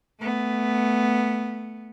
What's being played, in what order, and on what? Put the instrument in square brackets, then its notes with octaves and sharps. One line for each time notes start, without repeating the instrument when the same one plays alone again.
[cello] A3 B3